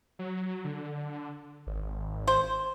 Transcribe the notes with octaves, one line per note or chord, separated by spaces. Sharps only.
F#3
D3
G#1
C5